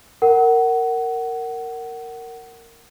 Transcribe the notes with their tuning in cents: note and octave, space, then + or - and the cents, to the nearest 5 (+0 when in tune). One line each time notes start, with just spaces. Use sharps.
A#4 -15 F#5 +20